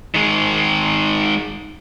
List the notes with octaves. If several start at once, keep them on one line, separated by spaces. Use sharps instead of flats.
D#3 G#3